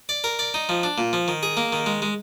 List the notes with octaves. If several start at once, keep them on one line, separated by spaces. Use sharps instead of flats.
D5
A#4
D5
D#4
F3
D4
A#2
F3
D#3
G#4
A#3
D#3
G#3
G#3